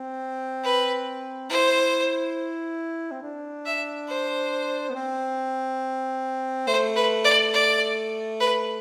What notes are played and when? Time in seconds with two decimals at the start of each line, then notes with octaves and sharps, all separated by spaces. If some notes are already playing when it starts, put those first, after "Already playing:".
Already playing: C4
0.63 B4
1.50 E4 C5
3.11 C4
3.22 D4
3.66 E5
4.08 C5
4.89 B3
4.94 C4
6.67 A3 C5
6.96 B4
7.24 D5
7.54 D5
8.40 B4